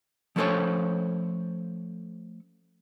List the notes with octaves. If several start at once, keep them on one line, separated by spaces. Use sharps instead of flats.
F3 A3 C#4 A4 C5 C#5